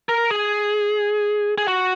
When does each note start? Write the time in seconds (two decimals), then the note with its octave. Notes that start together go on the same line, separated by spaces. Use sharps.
0.09 A#4
0.30 G#4
1.58 G#4
1.68 F#4